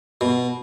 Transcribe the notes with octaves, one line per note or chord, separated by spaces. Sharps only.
B2